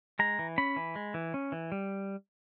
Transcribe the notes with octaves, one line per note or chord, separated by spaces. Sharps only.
G#3 A#5
E3
C#4 B5
E3
G#3
E3
C#4
E3
G3